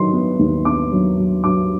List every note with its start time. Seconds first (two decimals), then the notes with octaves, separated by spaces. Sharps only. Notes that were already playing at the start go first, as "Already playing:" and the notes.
Already playing: D#3 F#3 C6
0.13 B3
0.39 D#2
0.65 B3 D6
0.92 F#3
1.18 F#3
1.44 F#3 D6